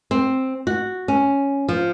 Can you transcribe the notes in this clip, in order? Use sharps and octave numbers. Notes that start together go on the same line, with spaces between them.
C4
F#4
C#4
F3